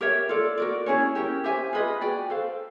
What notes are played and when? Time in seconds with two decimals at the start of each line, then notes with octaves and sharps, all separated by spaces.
0.01 G4 A#4 C#5 E5
0.29 F4 A4 D5
0.58 F#4 A#4 D5
0.86 C#4 E4 G#4 C#5
1.15 C#4 E4 G4 A#4
1.44 G4 C5 E5 G#5
1.73 F4 G#4 B4 D#5
2.01 F#4 B4 D5 G5
2.30 A4 C5 F5